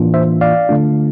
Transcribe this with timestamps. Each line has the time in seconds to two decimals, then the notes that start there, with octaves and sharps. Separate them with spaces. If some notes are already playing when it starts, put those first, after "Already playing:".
Already playing: A2 E3 A#3 D4 F4
0.14 C5 E5
0.41 D5 F5
0.69 D3 A3 D4 F4